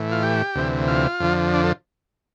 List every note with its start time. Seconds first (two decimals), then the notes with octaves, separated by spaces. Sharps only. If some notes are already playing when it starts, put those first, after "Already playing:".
Already playing: A2 E3
0.12 F4
0.23 G4
0.55 D2 C3 E3
0.88 F4
1.20 F2 D3 F3
1.53 D4
1.64 A4